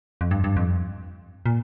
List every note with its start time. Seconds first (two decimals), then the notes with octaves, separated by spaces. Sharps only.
0.21 F2
0.31 G2
0.44 G2
0.57 F2
1.46 A#2